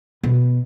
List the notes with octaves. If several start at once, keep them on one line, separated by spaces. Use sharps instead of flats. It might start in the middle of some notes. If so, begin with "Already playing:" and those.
B2